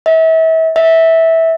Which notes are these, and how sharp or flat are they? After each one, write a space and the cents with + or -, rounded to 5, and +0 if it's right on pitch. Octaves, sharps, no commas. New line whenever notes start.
E5 -35
E5 -15